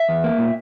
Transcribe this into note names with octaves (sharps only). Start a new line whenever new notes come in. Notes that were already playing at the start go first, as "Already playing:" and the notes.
Already playing: E5
E2
A#3
A#2